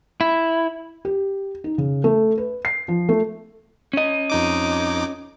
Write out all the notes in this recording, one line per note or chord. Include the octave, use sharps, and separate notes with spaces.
E4
G4
D#4
C#3
A3
B4
C7
F3
A3
C#4 D#5
F2 D#4 D6